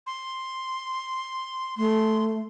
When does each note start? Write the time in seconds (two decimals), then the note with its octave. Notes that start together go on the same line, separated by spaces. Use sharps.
0.07 C6
1.77 A3 C6